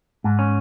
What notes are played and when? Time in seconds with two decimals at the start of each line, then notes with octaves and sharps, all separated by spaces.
0.24 G#2
0.39 C#4